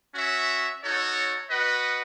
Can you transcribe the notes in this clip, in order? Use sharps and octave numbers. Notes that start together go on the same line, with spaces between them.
C#4 F#4 C#5 E5
D#4 F#4 A4 C#5
F#4 B4 D#5 F#5